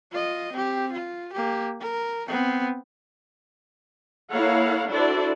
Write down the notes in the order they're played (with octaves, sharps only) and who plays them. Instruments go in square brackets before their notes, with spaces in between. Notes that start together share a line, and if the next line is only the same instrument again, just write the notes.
[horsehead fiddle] F4 D#5
C4 G4
F4
A#3 G4
A#4
B3 C4
[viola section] A#3 E4 A4 C#5 F5 F#5
D4 E4 F#4 A4 C5 D5